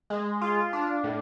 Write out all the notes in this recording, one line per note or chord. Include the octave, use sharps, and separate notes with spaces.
G#3
F4
D4
A2